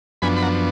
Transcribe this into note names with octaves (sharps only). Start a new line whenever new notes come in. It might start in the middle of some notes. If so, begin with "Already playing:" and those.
F#2 F3 B3 D4 G#5 B5
B5
F#5 A#5